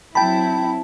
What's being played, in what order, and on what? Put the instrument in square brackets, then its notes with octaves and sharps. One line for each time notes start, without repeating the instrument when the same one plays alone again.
[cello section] F#3 C4 E4 [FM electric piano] G5 B5 [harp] A5